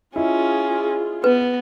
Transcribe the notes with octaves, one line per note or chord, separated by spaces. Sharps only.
C#4 E4 F4 G#4 D#5
B3 B4